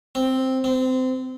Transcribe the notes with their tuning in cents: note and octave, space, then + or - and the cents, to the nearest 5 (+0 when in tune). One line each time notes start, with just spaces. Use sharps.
C4 +0
C4 -25